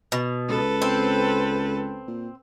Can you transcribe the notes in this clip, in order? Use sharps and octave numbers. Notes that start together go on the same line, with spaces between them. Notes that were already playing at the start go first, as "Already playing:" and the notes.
B2
C#2 A4 B4
C4
A#2